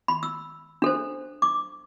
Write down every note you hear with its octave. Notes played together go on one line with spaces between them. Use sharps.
B5
E6
D4 A4 C5
D6